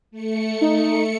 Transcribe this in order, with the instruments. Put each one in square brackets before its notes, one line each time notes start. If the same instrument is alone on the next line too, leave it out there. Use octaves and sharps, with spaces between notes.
[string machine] A3 C#7
[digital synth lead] D#4